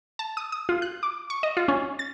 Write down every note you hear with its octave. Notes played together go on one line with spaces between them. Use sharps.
A5
D#6
D#6
F4
F#6
D6
C#6
D#5
F4
C#4
A6